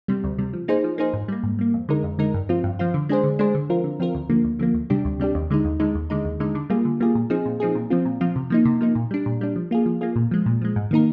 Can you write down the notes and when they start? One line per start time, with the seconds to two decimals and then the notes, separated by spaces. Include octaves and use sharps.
0.08 C3 G3
0.24 D2
0.38 C3 G3
0.53 F3
0.68 A#3 D#4 G#4 C5
0.84 F3
0.98 A#3 D#4 G#4 C5
1.13 G#2
1.28 G3 A#3
1.43 G#2
1.59 G3 A#3
1.74 F2
1.89 D3 G#3 D#4 A#4
2.04 F2
2.18 D3 G#3 D#4 A#4
2.34 G2
2.49 F3 C4 F4
2.64 G2
2.79 F3 C4 F4
2.94 D3
3.09 G#3 D4 G#4 C5
3.24 D3
3.39 G#3 D4 G#4 C5
3.55 D3
3.70 F3 C4 F4 A#4
3.84 D3
4.00 F3 C4 F4 A#4
4.15 D2
4.29 D3 F3 A#3
4.44 D2
4.59 D3 F3 A#3
4.74 D2
4.90 C3 G3 D4 G4
5.05 D2
5.20 C3 G3 D4 G4
5.35 D#2
5.50 D3 G#3 D#4
5.65 D#2
5.80 D3 G#3 D#4
5.95 D#2
6.10 D3 G#3 D#4
6.25 D#2
6.40 D3 G#3 D#4
6.55 D3
6.70 G3 A#3 F4 G#4
6.85 D3
7.00 G3 A#3 F4 G#4
7.15 A#2
7.30 F3 C4 D#4 G#4
7.46 A#2
7.60 F3 C4 D#4 G#4
7.75 A#2
7.90 F3 C4 F4
8.05 A#2
8.21 F3 C4 F4
8.36 C3
8.50 F3 A#3 D#4
8.65 C3
8.81 F3 A#3 D#4
8.95 A#2
9.11 G3 D4
9.26 A#2
9.41 G3 D4
9.56 F3
9.71 A#3 F4 G#4
9.86 F3
10.01 A#3 F4 G#4
10.16 A#2
10.31 F3 G#3
10.46 A#2
10.61 F3 G#3
10.76 G#2
10.91 D#3 A#3 D#4 A#4